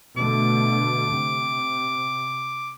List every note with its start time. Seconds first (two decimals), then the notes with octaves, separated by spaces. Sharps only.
0.17 B2 D3 A3 D6
1.13 C3